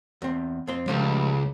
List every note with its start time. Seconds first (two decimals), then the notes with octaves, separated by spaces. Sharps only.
0.22 E2 C4
0.67 F2 C4 C6
0.88 C#2 F3 G3 A3